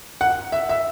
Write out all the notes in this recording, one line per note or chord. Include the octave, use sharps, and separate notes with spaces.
F#5
E5
E5